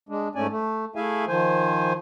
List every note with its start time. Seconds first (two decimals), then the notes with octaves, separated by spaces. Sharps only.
0.09 G#3 D4
0.35 G#2 A3 C#4 D5 G#5
0.50 A3
0.96 A3 E4 G#4 E5 F5 G#5
1.28 D#3 F3 C5 G#5